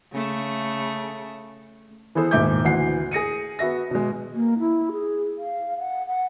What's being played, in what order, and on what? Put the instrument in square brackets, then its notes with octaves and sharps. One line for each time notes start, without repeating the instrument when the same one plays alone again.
[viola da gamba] C#3 A3
[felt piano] E3 B3 E4 G#4 A4 C5
D#1 G#2 E5 D6 G6
D2 E3 F#5 C7
G#4 A#6 C#7 D#7
B3 F#4 E5 A#6
B2 G#3
[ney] A#3
E4
G#4
F5
F#5
F#5